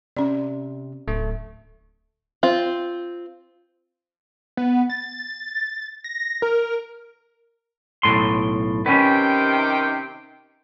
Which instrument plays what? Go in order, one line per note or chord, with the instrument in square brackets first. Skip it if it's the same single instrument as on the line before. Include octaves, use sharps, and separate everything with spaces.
[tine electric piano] C3 [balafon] C#4 D5
[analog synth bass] D1 [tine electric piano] A3
[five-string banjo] C4 F4
[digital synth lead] B3
A6
A#6
A#4
[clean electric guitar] B1 A2 C6
[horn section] C3 D#3 G5 [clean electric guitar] C#4 B4